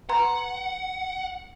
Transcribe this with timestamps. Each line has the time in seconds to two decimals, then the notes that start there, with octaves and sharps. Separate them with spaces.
0.09 B4 F#5 A#5 C6